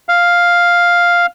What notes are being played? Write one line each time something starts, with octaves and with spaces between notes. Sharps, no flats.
F5